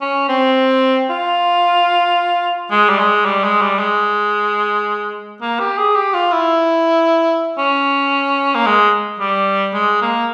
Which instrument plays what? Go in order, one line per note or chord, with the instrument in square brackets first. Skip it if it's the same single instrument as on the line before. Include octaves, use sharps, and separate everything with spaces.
[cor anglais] C#4
C4
F4
G#3
G3
G#3
G3
G#3
G3
G#3
A#3
G4
G#4
G4
F4
E4
C#4
A#3
G#3
G3
G#3
A#3